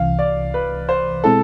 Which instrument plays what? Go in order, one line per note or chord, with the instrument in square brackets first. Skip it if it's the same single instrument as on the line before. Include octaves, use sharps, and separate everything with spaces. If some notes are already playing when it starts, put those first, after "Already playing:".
Already playing: [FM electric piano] C2 C3 E3 [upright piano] F5
[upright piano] D5
B4
C5
[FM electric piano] B2 G#3 C4 E4 G#4 [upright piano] A4